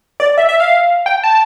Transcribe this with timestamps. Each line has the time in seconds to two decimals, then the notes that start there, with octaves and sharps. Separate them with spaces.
0.20 D5
0.38 E5
0.49 E5
0.60 F5
1.06 G5
1.23 A5